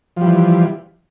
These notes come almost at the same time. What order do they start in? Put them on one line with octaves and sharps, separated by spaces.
F3 G3 E3